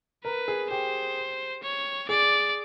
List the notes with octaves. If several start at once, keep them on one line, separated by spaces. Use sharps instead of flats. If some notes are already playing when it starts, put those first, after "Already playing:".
A#4 B4
G#4
G4 C5
C#5
G#4 D5